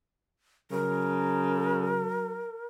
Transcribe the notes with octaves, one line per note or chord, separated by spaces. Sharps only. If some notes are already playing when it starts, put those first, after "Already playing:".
C#3 F#3 A#4